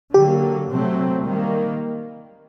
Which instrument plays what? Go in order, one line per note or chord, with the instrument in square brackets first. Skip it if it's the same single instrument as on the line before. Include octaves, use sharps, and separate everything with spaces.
[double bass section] D3 F#3 A#3 [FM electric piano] G4
[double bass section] C3 F#3 A3 C4
D#3 G3 A#3